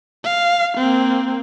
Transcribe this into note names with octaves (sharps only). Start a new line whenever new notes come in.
F5
A#3 C4